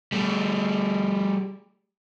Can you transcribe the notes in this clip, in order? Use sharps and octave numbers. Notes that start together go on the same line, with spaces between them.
G3 A3